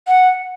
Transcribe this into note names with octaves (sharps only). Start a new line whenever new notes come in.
F#5